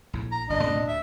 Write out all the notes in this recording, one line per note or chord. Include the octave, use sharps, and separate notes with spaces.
A#1 A2
A#5
G1 F#2 D4 D#5
G#2 C4
A2
D2 E5